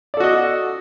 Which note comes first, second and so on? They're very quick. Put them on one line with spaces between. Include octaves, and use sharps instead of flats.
D5 A4 F#4 D#5